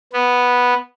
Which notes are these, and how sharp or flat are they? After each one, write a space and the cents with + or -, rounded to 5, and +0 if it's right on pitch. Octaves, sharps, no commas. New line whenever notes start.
B3 -5